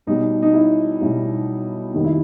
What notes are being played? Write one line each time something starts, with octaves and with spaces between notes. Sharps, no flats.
B1 B2 G3 D#4
D#4
E4
B1 B2 G3 E4
F1 D#2 D#3 D#4
E4